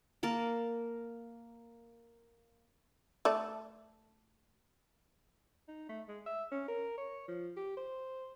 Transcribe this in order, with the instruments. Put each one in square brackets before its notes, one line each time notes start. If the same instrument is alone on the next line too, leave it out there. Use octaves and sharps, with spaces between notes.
[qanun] A#3 A#4 A5
[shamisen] A3 A4 D5
[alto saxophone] D#4
A3
G#3
E5
C#4
A#4
C#5
F3
G4
C5